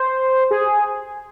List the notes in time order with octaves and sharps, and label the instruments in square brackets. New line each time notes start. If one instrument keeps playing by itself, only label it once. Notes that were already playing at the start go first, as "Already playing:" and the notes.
Already playing: [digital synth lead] C5
G#4